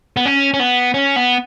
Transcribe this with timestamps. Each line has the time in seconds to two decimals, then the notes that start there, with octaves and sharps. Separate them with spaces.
0.17 B3
0.25 C#4
0.54 C#4
0.60 B3
0.94 C#4
1.16 B3